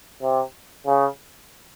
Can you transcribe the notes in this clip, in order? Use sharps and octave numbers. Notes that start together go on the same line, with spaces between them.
C3
C#3